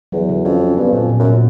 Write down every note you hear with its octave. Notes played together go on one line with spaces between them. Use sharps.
E2 F#3
D3
F2 C#4
C#4
G2 B3
F2 A#2
A#2
F#2
A#2